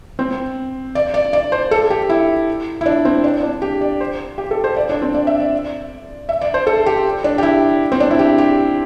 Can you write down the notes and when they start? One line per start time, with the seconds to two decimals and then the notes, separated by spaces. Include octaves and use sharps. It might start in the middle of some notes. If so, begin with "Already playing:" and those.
0.19 C4
0.95 D5
1.14 D5
1.33 D5
1.52 C5
1.71 A4
1.90 G4
2.09 E4
2.81 E4
2.86 D4
3.05 C4
3.24 D4
3.43 D4
3.62 G4
3.81 D5
4.00 C5
4.38 G4
4.51 A4
4.64 C5
4.76 D5
4.89 D4
5.02 C4
5.14 D5
5.27 E5
5.40 D5
6.29 E5
6.41 D5
6.54 C5
6.67 A4
6.86 G4
7.24 D4
7.38 G4
7.43 E4
7.92 C4
8.00 D4
8.11 E4
8.19 G4
8.38 G4